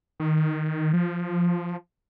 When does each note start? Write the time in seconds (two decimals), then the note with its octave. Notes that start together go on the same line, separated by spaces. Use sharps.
0.20 D#3
0.93 F3